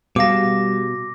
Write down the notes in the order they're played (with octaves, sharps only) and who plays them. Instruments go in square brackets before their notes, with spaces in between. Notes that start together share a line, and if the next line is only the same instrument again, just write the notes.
[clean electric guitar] B2 [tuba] G3 [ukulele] G#4 F5 A5 [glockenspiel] D6 A#6